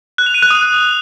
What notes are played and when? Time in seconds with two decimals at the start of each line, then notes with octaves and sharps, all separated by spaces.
0.18 F#6
0.26 F7
0.34 D#7
0.42 F#6
0.50 D#6